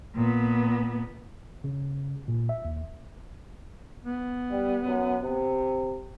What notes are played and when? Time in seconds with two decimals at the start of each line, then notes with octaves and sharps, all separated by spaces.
0.16 A#2 B3
1.64 C#3
2.28 A#2
2.49 E5
2.65 D#2
4.04 B3
4.51 G3
4.86 F#2
5.22 C3